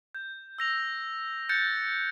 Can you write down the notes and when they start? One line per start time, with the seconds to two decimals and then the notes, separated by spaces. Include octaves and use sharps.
0.15 G6
0.58 E6 A#6 F7
1.49 F#6 G6 A6 C#7